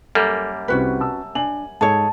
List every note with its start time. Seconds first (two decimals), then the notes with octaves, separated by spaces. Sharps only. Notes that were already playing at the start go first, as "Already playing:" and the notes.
0.15 F#2 G3 A#3 A4
0.68 C2 C4 C#4 F#4 B4
1.00 A5 E6
1.35 D4 G#5 F#7
1.81 G#2 G#4 A4 C#5 A5